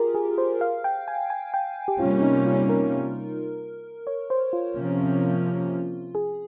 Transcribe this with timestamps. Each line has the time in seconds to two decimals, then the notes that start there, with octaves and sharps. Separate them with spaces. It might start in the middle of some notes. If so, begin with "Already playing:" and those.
Already playing: F4 G4 G#4 A#4
0.15 G#4
0.38 C5
0.61 F5
0.84 G5
1.08 G#5
1.30 G#5
1.54 G5
1.88 G4
2.00 C3 G3 A#3 C#4 F4
2.22 D#4
2.46 F4
2.69 A#4
4.07 C#5
4.30 C5
4.53 F4
4.76 C3 F3 A#3 C#4
6.15 G#4